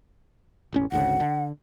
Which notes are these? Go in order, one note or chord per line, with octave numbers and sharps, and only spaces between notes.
E1 A1 C#4
G#1 D2 C#3 F#5
D3